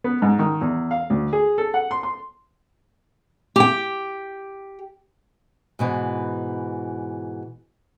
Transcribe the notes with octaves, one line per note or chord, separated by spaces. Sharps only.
B3
G#2
D#3
E2
F5
D2
G#4
A4
F#5
C6
C6
G4 G5
G#2 B2 E3